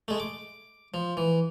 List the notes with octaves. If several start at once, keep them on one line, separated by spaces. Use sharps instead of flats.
G#3 A3
D6
F3
E3